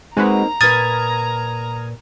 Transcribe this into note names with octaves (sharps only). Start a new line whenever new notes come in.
G#3 A#3 C4 D#4 F#4 B4 A#5
A#2 B4 D#6 F6 G#6 A6